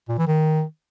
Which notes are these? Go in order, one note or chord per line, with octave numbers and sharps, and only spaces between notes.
A#2
E3
D#3